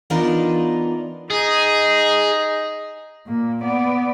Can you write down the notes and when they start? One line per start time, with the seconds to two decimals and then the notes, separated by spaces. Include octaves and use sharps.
0.10 E3 B3 D4 D#4 F4 A#4
1.31 D#4 G#4
3.27 A#2 A#3
3.63 B3 D5